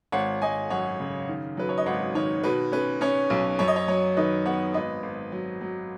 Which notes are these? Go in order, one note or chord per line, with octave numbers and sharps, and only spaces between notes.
G#1 C#5 F#5
G#1 D#5 G#5
F#2 C#5 F#5
C#3
D#3
F#3 B4
C#5
D#5
G#1 C#5 F#5
D#3 C#5
B2 B4
C#4 B4
C#4 C#5
B1
F#2 C#5
D#5
C#5
F#3 C#5
D#3 B4 D#5
B3 C#5 F#5
G#1 B4 D#5
G#1
F#3
F#3